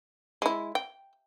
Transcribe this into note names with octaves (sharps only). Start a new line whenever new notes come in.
G#3 E4
G5